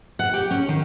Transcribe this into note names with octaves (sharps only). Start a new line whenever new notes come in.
F#5
G4
C#4
D#3